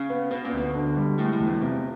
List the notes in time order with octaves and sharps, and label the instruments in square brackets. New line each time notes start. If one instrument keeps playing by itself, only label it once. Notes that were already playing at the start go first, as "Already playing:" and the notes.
Already playing: [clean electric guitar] C#3
[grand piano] B3
[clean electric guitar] B2 [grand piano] B3
[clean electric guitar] A#2
[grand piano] D2 [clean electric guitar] B2
[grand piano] D3
G3
[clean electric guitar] A2 [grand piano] G#3
[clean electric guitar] A2
[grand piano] E2
[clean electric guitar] F#2
[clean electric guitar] F2 [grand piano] C3